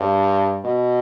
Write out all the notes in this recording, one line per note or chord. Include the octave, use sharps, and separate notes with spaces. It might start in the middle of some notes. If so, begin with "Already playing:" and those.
Already playing: G2
B2